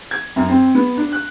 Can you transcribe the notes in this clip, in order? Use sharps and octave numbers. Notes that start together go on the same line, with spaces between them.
G#6
F#2
C4
B3
D4
F#6